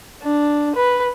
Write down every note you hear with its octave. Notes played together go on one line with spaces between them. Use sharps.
D4
B4